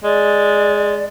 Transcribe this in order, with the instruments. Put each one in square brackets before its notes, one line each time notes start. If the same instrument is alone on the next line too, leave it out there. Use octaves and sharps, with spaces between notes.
[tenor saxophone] G#3 [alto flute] D5